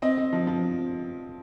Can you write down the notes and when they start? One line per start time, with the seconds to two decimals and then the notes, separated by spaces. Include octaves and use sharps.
0.02 C4 D#5
0.17 C4
0.33 F3
0.47 F3